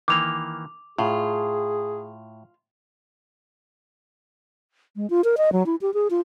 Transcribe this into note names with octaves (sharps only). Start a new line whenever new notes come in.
D#3 E3 A#3 D6 F7
A2 F4 G#4
G#3
F4
A#4
D#5
F#3
E4
G4
G#4
F4